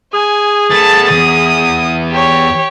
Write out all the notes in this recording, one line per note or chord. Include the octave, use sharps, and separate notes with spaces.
G#4 G#5
A3 B3 A5 A6
E2 D#6
G4 C#5